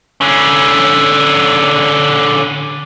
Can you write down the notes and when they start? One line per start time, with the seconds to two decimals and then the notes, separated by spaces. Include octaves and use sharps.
0.21 D3 C#4